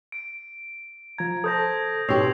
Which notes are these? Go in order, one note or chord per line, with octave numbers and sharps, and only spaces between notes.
D7
F3 A#5 G#6
A4 C5 A5 D#6 G6 A#6
B2 G4 C#5 C6 E6 C7 F7